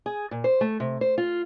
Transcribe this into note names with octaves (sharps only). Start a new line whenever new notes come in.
G#4
A#2
C5
A3
C3
C5
F4